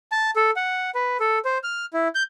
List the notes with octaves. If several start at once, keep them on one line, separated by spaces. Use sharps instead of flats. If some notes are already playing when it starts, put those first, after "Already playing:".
A5
A4
F#5
B4
A4
C5
F6
E4
G6